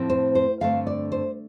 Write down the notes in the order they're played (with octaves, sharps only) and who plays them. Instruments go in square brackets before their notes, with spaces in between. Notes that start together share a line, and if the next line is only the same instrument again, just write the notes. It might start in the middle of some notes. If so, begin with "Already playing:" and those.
Already playing: [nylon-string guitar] A2 F3 A3 C4
C5
C5
G2 D3 A3 C4 F5
D5
C5